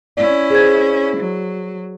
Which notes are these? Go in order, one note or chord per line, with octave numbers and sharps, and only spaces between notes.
C#4 E4 D5
G#4 C5 G#6
F#3